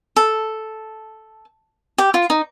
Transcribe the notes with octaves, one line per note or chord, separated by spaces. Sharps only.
A4
G4
F4
D#4